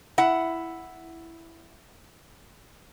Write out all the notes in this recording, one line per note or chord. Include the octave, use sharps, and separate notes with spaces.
E4 F#5